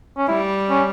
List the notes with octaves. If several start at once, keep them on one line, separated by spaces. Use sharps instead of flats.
C#4
G3 E4
C#4